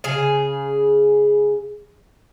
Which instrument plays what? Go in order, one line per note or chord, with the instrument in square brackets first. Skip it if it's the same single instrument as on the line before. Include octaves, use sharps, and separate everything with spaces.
[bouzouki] C#3 G#4